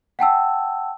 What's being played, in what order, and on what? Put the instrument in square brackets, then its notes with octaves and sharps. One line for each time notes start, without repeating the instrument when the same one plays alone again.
[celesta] F#5 G5 A5 E6